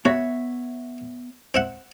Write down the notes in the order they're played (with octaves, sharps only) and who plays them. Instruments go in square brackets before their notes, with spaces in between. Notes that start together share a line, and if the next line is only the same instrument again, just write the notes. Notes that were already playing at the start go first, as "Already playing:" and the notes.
[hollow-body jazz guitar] B3 C#5 E5 [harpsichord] F#4
[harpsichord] C4 E5 F#5